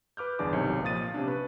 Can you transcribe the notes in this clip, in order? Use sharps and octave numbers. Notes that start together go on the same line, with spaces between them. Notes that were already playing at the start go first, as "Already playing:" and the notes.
B4 D6 F6 G6
G1 E2 D4 G#4 D5 D6
B1 C3 D#3 C#5
A#2 F3 F5 D#6 A6 D#7
C3 C#4 D4
B4 C#6